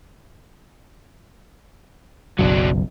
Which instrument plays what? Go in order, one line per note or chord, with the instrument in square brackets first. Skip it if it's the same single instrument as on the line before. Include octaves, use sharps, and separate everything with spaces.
[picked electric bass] F#1 B1 [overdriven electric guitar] F#3 D4